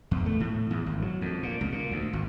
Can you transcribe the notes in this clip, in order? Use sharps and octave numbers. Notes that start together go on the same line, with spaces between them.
E2
A3
A2
E2
G#1
F#3
F2
A#2
C#2
A#2
D2
G#1